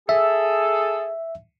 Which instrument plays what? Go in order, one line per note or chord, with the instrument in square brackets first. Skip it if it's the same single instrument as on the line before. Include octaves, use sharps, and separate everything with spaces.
[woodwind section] G#4 A4 [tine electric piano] E5